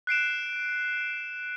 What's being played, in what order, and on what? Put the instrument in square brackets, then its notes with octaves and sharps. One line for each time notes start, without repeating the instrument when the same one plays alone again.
[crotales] F#6 C7 D7 E7